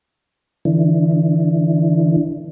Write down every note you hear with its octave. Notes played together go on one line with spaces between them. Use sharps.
D3 E3